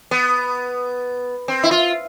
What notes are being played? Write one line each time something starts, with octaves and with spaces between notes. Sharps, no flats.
B3
C4
E4
F4